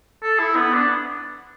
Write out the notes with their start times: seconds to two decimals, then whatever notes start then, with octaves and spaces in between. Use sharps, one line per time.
0.23 A4
0.39 E4
0.56 B3
0.74 D4